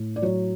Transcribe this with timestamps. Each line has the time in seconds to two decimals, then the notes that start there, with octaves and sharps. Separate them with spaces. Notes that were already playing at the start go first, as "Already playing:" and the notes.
Already playing: A2
0.16 D5
0.22 F#3 C#5